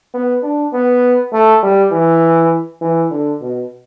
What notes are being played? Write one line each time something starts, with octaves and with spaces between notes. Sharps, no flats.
B3
D4
B3
A3
G3
E3
E3
D3
B2